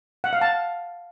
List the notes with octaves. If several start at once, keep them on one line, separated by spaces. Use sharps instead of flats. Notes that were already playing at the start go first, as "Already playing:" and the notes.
F#5
F5
A5